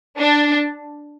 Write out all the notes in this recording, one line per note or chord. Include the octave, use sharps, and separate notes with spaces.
D4